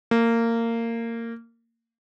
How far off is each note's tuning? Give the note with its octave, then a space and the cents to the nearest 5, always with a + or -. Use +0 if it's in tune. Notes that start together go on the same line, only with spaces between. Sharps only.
A#3 -20